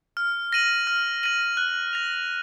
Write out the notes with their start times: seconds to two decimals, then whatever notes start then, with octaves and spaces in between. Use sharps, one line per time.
0.17 F6
0.53 A#6 D#7 F#7
0.87 F6
1.23 A#6 D#7 F#7
1.57 F#6
1.93 A#6 F7